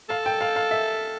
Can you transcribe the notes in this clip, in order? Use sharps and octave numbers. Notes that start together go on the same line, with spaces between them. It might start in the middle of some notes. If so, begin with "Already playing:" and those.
A4 F5
G5
F5
F5
E5